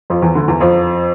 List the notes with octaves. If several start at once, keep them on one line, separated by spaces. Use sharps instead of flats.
F2 F3
E2 E3
D2 D3
E2 E3
F2 F3